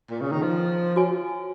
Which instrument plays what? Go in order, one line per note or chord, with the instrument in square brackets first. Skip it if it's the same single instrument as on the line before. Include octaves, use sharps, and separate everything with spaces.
[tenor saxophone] A#2
C#3
D#3
F3
[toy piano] F#4 C#5 G#5